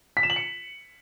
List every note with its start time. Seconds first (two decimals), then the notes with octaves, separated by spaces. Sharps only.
0.17 B6
0.23 E7
0.30 F#7
0.36 C#7